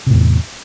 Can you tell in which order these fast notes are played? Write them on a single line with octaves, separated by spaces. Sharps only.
C3 A2 E2